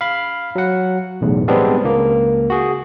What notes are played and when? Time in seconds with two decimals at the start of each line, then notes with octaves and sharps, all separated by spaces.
0.01 F5 B5
0.55 F#3 F#5
1.21 B1 E2 A2
1.48 G3 G#3 B3 C4 D4
1.84 C#2 A#3
2.50 F#4 G#4